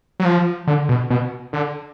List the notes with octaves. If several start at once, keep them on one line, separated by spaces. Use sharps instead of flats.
F#3
F3
D3
B2
B2
D3